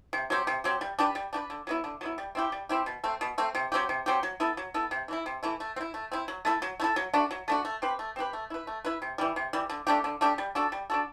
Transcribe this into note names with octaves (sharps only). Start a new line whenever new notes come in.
C3
F#3 C4 G4
C3
F#3 C4 G4
G3
D4 G4 B4
G3
D4 G4 B4
D3
F#3 B3 E4
D3
F#3 B3 E4
G3
C4 E4 G4
G3
C4 E4 G4
B2
A3 C4
B2
A3 C4
C3
F#3 C4 G4
C3
F#3 C4 G4
F#3
B3 E4 A4
F#3
B3 E4 A4
C3
E3 A3 E4
C3
E3 A3 E4
A3
C4
E4
A3
C4 E4
F#3
A3 E4 A4
F#3
A3 E4 A4
F#3
A3 D4 F#4
F#3
A3 D4 F#4
A3
C4 G4 B4
A3
C4 G4 B4
A3
E4 B4
A3
E4 B4
C3
E3 G3
C3
E3 G3
D3
A3 D4 G4
D3
A3 D4 G4
G3
D4 F#4 A4
G3
D4 F#4 A4